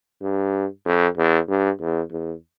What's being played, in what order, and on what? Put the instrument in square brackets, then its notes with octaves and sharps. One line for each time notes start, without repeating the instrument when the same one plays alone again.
[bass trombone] G2
F2
E2
G2
E2
E2